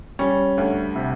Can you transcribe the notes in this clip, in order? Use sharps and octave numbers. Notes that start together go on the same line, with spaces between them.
G3 C#4
D2
C3